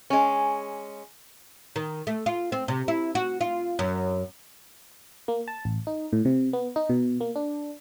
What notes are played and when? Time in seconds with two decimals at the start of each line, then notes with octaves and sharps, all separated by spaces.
0.10 G#3 C#4
1.76 D#3
2.07 A3
2.26 F4
2.52 C4
2.68 C3
2.88 E4
3.15 F#4
3.41 F4
3.79 F#2
5.28 A#3
5.48 A5
5.65 A1
5.87 D#4
6.13 A2
6.25 C3
6.53 B3
6.76 D#4
6.89 B2
7.21 A#3
7.36 D4